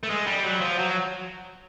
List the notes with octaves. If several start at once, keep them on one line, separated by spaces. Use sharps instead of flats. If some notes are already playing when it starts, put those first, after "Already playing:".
A3
G#3
G3
F#3
F3
F#3